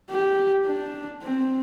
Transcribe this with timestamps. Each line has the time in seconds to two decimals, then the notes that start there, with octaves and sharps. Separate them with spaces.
0.11 G4
0.67 D4
1.23 C4